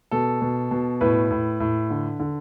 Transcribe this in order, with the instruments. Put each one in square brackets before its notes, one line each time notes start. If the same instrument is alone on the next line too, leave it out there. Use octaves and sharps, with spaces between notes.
[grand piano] B2 A4
B2
B2
A2 B4
A2
A2
D3
D3